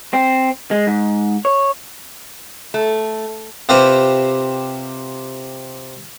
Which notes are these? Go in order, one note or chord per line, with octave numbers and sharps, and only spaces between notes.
C4
G#3
G#2
C#5
A3
C3 C4 F4 G4 B4 C5